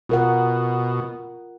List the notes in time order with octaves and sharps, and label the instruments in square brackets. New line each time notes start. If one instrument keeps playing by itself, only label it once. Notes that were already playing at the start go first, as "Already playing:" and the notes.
[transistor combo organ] B2 [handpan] F4 A#4 F#5